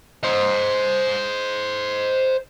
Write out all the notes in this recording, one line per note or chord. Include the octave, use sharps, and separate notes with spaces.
C5 D#5